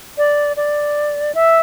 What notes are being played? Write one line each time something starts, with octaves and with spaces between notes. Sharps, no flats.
D5
D5
E5